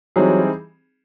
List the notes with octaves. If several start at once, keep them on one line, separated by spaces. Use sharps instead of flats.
E3 F#3 G3 C4 D#4 G#4